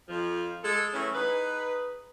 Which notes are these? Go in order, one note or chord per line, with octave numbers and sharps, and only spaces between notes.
F2 F3
G#3 G#4 A4
E3 F#3 A3 C#4
D#4 G#4 B4